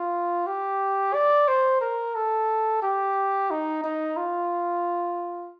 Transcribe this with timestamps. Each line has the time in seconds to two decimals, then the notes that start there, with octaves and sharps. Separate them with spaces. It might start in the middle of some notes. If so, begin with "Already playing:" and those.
Already playing: F4
0.47 G4
1.14 D5
1.48 C5
1.81 A#4
2.15 A4
2.83 G4
3.51 D#4
3.84 D#4
4.17 F4